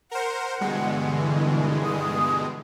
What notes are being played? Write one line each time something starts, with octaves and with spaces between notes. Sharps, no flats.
A#4 C5 F#5
G2 B2 D3 E3 G#3
D#6